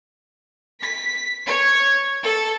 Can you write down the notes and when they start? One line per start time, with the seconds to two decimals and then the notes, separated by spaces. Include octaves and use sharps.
0.81 B6
1.47 C#5
2.23 A4